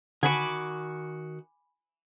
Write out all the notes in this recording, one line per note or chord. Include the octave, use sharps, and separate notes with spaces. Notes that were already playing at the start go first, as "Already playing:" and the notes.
D3 D#3 F#4 F#5 G#5 A5 B5 D6